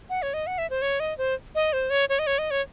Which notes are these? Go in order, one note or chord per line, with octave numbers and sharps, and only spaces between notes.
F#5
C#5
D#5
F#5
E5
C5
C#5
D#5
C5
D#5
C5
C#5
C#5
D#5
C#5
D#5
C#5